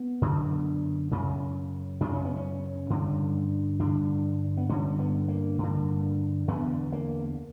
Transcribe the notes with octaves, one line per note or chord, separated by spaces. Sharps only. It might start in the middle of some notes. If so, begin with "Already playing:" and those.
Already playing: B3
F#2 D3
F#2 C#3
F#2 C#3 D4
C#4
B3
C#4
G2 D3
G2 D3 D4
B3
G2 D3 C#4
B3
A#3
G2 D3
E2 D3 B3
A#3